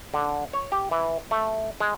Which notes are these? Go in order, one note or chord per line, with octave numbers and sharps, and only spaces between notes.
D3
C#5
G4
E3
A3
G#3